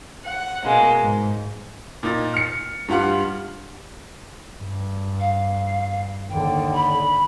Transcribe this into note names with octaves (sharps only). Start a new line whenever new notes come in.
F#5
B2 G#3 A#3
G#2
A#2 D#4 A6
F6 C#7
G2 G3 F4 F#5
G2
F5
D#2 D3 G5
B5